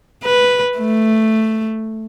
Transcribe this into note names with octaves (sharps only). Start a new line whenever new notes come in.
B4
A3